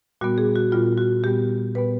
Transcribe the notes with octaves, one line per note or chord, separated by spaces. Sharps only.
A#2 G3 B3 F#4
G#4
F#4
A#2 G3 B3 F4
F#4
A#2 G3 B3 G4
A#2 G3 B3 B4